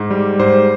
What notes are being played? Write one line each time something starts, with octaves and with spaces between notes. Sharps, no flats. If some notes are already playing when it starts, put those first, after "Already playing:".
Already playing: G#2
G3
G#2 C5